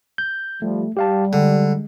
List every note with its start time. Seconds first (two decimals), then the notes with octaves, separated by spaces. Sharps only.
0.18 G6
0.62 F3 G3 A3
0.97 G3 G4 F5 A5
1.33 D3 G#3